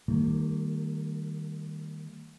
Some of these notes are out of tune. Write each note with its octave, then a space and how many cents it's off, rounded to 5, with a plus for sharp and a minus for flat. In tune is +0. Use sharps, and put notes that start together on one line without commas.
D#3 +0 G3 +0 A#3 -40